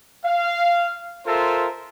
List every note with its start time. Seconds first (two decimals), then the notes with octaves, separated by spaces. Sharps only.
0.25 F5
1.27 F4 A4 A#4 C5 E5